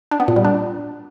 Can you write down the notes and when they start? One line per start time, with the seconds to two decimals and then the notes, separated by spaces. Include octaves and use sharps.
0.11 D4
0.20 B3
0.28 A#2
0.36 G3
0.45 D4